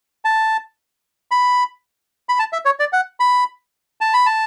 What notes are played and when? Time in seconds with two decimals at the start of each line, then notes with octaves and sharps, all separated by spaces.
0.25 A5
1.31 B5
2.29 B5
2.39 A5
2.53 E5
2.65 C#5
2.80 D5
2.93 F#5
3.20 B5
4.01 A5
4.14 B5
4.26 A5